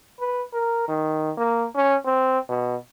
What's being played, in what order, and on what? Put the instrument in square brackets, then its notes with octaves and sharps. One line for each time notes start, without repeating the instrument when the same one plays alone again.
[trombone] B4
A#4
D#3
A#3
C#4
C4
B2